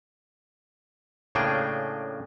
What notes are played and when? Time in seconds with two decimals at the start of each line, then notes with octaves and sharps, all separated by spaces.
1.35 A2 C#3 A#3 D4 G#4 G5